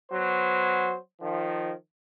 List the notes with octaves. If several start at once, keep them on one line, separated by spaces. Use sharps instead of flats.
F#3 B3 C5
D#3 F3